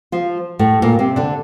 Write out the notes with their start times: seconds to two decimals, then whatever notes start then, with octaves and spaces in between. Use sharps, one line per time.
0.12 F3 F4
0.59 A2 A3
0.82 A#2 A#3
0.99 C3 C4
1.16 D3 D4